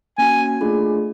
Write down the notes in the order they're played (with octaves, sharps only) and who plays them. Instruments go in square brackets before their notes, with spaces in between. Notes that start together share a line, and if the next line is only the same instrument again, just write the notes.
[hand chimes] A#3 C#4 F#4 [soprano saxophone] G#5
[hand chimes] A3 D4 F4 G#4